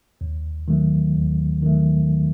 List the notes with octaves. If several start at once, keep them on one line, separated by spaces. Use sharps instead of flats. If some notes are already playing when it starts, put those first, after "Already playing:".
D#2
D#3 F#3 A3
D#2
D#3 F#3 A3